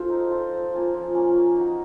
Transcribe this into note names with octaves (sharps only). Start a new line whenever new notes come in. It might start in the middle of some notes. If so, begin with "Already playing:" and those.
Already playing: F4 A4 C5 F5
D#4
A4 C5 F5
F3
A#3 C#4 F4
F3
A#3 C#4 F4
A#3
D#4 F#4